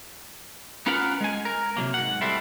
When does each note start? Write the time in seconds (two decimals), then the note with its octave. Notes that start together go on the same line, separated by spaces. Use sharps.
0.86 B3 C#4 F4 A#4 B4 F#5
1.21 G#3 G#5
1.45 A#4
1.77 C3 E3 F#3 A#3
1.94 G#2 F#5
2.21 G3 A3 C4 E4